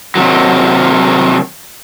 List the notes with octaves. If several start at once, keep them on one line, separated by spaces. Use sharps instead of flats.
C3 D#3 F#3